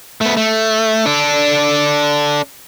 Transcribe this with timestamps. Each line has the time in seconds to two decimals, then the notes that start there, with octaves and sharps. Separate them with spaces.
0.21 A3 B3
0.37 A3
1.06 D4 A4